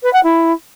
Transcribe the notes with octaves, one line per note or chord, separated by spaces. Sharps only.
B4
F#5
E4